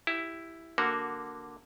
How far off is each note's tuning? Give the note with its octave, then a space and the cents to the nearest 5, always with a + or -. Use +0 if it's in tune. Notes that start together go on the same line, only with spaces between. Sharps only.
E4 +5 G4 +0
D3 +0 A#3 +0 F#4 +0